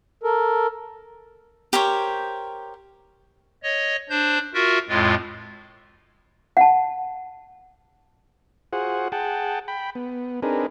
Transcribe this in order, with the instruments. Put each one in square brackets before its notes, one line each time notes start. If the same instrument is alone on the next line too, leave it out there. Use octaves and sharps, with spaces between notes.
[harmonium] A4 A#4
[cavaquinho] G4 A#4 C5 C#5
[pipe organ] C#5 D#5
D4 C5 G6
F4 F#4 A#4 E5
F2 A2 G#3 F4
[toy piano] F#5 A5
[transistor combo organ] F4 F#4 G#4 C5 F#5
G#4 F#5 G5 A5
G5 B5
B3
C4 D4 D#4 G#4 A#4 B4